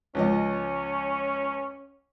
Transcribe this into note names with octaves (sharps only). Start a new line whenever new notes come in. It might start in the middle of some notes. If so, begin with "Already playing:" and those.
C#2 F3 C#4 D#5